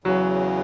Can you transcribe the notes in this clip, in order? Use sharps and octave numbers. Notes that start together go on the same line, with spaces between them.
E2 C#3 E3 F#3